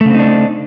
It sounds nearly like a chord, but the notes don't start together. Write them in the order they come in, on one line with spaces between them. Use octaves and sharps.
A3 C#3 C4 D#4 D4